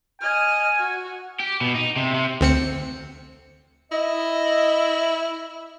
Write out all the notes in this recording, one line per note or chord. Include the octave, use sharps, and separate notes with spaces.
D#5 G#5 F6
F#4
G4
B2
D#4
C3
C3
D2 C4 C#7
E4 D#5